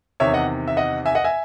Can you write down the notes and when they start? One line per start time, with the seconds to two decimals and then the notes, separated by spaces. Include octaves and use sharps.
0.20 E2 C3 D#3 C#5 E5
0.34 D#5 F#5
0.68 E5
0.77 D#5 F#5
1.06 E5 G#5
1.15 D#5 F#5
1.24 E5 G#5